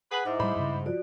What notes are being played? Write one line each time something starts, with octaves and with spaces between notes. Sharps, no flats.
G#4 B4 F#5
G#2 E4 E5 D6
A2 G3 C5 B5
G2 C#3
F3 F#4 D5